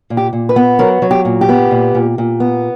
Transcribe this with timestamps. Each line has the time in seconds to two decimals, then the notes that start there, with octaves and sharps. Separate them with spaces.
0.10 A#2
0.17 G4
0.33 A#2
0.49 B4
0.56 B3
0.79 F#3 A#4
1.02 F#3
1.11 G4
1.25 A#2
1.41 G4
1.49 B3
1.71 A#2
1.95 A#2
2.18 A#2
2.40 B3